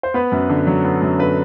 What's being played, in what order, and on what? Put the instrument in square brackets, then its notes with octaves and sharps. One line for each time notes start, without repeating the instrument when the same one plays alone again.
[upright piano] C5
B3 B4
F#2
D3
F#3
B3
F#2
D3 B4